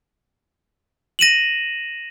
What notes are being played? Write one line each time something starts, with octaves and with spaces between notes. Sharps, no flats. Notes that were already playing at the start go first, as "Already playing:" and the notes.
A#6 D#7 E7 F#7